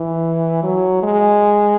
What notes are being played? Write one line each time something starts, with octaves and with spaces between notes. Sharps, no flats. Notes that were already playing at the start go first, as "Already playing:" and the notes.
Already playing: E3
F#3
G#3